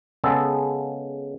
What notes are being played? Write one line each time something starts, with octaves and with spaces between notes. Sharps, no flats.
C#3 G#3 B3 A4